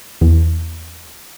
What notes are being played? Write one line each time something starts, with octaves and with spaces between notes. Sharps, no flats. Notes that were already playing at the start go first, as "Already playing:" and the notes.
E2